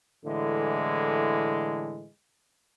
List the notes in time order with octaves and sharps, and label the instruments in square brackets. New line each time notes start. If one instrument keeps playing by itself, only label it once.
[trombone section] A2 D3 E3 G#3